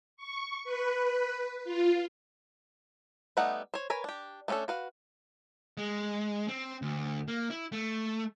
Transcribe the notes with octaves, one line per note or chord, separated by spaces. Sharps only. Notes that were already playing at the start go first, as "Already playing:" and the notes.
C#6
B4
F4
G3 A3 B3 D#4 F#5
C5 C#5
A#4 B4 C#5 G#5
D4 G4
A3 B3 C#4 D4 A4
F#4 B4 F5
G#3
C4
D2
A#3
E4
A3